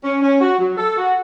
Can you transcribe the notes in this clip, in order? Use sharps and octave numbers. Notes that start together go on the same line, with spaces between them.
C#4
C#4
F#4
F#3
A4
F#4